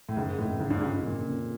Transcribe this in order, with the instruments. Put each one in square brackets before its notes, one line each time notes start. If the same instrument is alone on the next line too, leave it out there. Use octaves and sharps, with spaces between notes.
[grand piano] A2
[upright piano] F#1 [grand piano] G#2
[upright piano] F2 C#3 F3 [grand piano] A2
[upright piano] F#1 [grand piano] G#2
[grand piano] G2
[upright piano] F2 C#3 F3 [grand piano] G#2
[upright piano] F#1 [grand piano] A#2
[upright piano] F2 C#3 F3